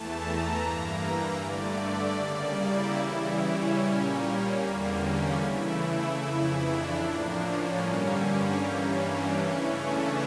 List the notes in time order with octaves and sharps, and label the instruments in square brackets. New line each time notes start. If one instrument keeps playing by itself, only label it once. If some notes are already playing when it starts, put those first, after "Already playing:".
Already playing: [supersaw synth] E2 E3 A3 A5
A#5
G2 E3 A#3
G2 D3 A3 D5
D5
C#3 G3 A#3
E4
C#3 E3 G3
C#4
A#2 G3 A#3
E2 D3 G3 A#3
C#4
C#3 E3 A3 E4
E4
F2 C#3 E3
D4
A2 F3 A#3
C#4
G2 D3 G3 A#3
C#4
G2 E3 G3 A#3
D4
C#3 E3 A3 C#4
D4